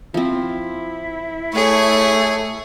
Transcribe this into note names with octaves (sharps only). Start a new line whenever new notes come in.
F3 C4 E4
A3 G#4 C#5